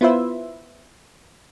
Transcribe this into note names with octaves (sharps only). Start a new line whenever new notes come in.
B3 E4 F4 B4 C5 E5